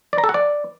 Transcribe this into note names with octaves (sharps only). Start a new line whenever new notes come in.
D5
A#5
A4
F#5
D5